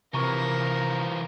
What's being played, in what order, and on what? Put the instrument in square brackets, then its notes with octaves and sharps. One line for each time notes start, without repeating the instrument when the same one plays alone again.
[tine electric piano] C3 A#5 C#6 [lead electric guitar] E3 F3 [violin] A#4